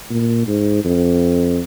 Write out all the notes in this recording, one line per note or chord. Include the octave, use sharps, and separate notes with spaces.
A#2
G#2
F2